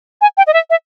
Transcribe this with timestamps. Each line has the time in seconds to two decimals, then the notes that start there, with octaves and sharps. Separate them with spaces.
0.21 G#5
0.37 G5
0.47 D#5
0.54 E5
0.70 E5